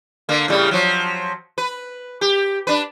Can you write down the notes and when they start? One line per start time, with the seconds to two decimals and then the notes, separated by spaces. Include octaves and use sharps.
0.29 D3 A#3
0.48 A2 C#3 G3
0.71 F3 F#3
1.58 B4
2.21 G4
2.67 D4 B4